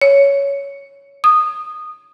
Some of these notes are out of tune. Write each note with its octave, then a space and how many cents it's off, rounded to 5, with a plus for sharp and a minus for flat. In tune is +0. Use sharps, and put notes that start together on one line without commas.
C#5 +10
D#6 -15